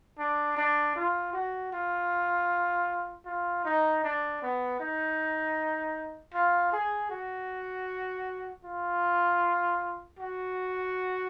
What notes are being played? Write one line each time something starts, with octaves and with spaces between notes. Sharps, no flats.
D4
D4
F4
F#4
F4
F4
D#4
D4
B3
D#4
F4
G#4
F#4
F4
F#4